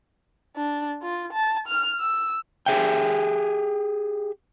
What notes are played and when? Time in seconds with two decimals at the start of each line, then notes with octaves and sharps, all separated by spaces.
0.56 D4
1.02 F4
1.33 A5
1.68 F6
1.99 E6
2.66 G4 G#4 E5 G5